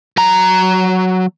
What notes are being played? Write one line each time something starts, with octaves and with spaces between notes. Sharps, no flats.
F#3 A#5